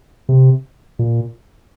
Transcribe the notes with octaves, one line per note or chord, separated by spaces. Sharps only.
C3
A#2